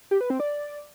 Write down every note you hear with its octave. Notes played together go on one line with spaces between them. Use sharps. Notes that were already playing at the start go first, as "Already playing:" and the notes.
G4
B4
C4
D5